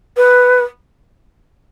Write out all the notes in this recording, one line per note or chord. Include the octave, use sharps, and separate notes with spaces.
B4